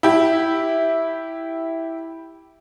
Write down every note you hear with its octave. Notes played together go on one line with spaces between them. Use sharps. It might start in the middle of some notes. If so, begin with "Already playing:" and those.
E4 G4